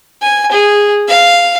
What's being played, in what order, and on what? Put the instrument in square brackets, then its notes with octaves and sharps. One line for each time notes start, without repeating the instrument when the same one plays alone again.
[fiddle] G#5
G#4
F5